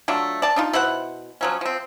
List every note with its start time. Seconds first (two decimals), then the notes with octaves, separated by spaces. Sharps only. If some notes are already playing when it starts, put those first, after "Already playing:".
0.08 F#3 A3 D4 F4
0.42 D5 A5
0.56 D4 D#4 F4
0.73 B2 E4 C5 F#5
1.41 F3 F#3 C#4
1.61 F3 C4